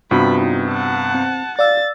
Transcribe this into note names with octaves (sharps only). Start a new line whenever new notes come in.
G2 C3 B3 F4 F#4 B5
D#4
F#5 A5
C4
D5 F5 E6 A6